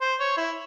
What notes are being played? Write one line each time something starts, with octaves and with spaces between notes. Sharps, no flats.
C5
C#5
E4